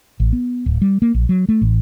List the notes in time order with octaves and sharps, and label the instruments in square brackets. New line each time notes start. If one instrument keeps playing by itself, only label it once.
[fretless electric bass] A1
B3
D1
G3
A#3
A#1
F#3
A3
A1